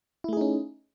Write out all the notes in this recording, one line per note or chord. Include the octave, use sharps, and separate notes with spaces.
A3 C#4 D#4 E4 G#4